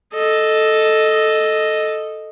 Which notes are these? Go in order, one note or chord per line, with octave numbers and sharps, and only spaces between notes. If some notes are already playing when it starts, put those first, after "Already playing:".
A4 D#5